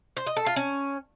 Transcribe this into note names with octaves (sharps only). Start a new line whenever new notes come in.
C5
D#5
A4
F4
C#4